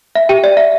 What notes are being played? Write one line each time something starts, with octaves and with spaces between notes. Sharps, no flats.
E5
G4 G5
D5
E5